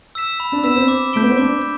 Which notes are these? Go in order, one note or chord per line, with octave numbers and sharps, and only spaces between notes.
E6 B6 E7
B5
D4
B3 E6 B6 E7
C4
D6
A3 G6 B6 D7 G7
B3
C4
D4 D6
G6